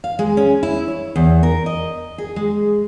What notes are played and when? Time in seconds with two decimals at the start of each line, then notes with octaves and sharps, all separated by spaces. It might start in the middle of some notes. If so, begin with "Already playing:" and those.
0.04 F5
0.19 G#3
0.37 C#4
0.63 E4
0.88 C#5
1.16 E2
1.43 A#4
1.66 D#5
2.18 G#4
2.36 G#3